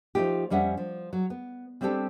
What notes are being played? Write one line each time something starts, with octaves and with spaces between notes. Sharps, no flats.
F3 A3 C4 D#4 F4 G4
F2 G3 C#4 E5 F#5
F3
F#3
B3
G3 C4 D4 F4 G4 A4